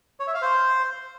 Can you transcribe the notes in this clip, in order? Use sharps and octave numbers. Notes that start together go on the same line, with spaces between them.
C#5
E5
F5
C5